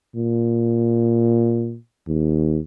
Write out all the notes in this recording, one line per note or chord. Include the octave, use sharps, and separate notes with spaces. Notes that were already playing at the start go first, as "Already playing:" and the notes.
A#2
D#2